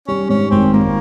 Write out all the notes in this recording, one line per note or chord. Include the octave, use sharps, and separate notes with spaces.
G3 C#4
G#2 C#4
G#1 C4
G#1 A#3